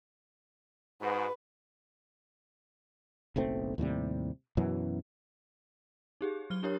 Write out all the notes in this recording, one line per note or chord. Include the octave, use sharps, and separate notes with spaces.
G#2 F#4 B4
F#1 B1 A3 C4
D#2 A2 C3 G3
F#2 B2 E3 F#3
D#4 G4 G#4
F#3 F6 G7
D4 E4 G4 A#4 C#5